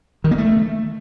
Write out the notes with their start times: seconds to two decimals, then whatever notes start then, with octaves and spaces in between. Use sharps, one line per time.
0.24 D#3
0.31 A#3
0.38 A3